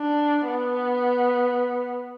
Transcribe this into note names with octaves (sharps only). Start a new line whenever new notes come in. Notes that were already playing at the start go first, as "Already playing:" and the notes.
Already playing: D4
B3